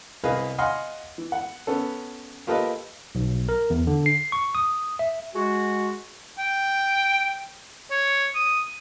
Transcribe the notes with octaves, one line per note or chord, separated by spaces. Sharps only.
C2 G#4 B4 D#5 F5
D#5 F5 F#5 G#5 C6 F6
E3
F#5
B3 C#4 A4
A#3 F4 G4 A4 B4 D#5
B1
A#4
E2
D3
C7
C#6
D#6
E5
G#3 F#4
G5
C#5
D#6